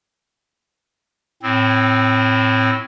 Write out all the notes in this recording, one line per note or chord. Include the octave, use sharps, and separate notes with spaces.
A2 C4